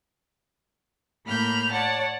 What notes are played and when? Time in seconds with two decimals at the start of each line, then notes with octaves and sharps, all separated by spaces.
1.25 A2 A#3 B5 F6 G6
1.72 C#5 D5 F#5 A5